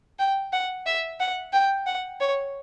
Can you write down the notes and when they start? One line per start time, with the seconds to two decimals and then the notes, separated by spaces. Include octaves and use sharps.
0.19 G5
0.53 F#5
0.86 E5
1.20 F#5
1.53 G5
1.86 F#5
2.20 C#5